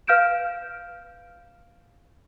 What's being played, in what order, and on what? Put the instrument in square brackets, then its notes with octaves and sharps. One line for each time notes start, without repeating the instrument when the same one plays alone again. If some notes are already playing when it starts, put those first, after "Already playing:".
[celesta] B4 F5 F6 G6 D7 E7